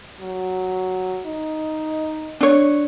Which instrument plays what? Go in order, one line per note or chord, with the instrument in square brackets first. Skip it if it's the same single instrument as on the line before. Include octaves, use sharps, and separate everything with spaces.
[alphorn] F#3
D#4
[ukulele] D4 C#5